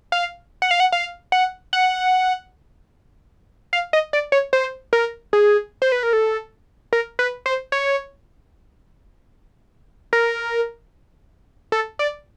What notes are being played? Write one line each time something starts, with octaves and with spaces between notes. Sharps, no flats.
F5
F#5
F5
F#5
F5
F#5
F#5
F5
D#5
D5
C#5
C5
A#4
G#4
C5
B4
A#4
A4
A#4
B4
C5
C#5
A#4
A4
D5